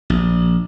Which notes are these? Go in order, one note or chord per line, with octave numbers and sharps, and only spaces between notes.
A#1